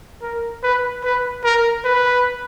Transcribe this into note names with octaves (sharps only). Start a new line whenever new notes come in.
A#4
B4
B4
A#4
B4